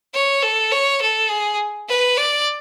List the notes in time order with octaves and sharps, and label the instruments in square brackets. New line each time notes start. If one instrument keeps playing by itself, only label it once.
[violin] C#5
A4
C#5
A4
G#4
B4
D5